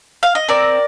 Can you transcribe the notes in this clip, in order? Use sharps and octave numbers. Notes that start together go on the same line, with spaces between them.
F5
D#5
C4 A#4 D5